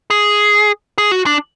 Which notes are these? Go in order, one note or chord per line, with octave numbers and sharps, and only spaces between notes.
G#4
G#4
F#4
D4